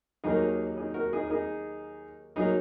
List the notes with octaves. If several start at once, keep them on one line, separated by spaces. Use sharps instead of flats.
D#2 D#3 F#3 A#3 D#4 G#4
D#4 G#4
F#4 A#4
D#4 G#4
A#4
D#4 G#4
F#3 A#3 D#4 G#4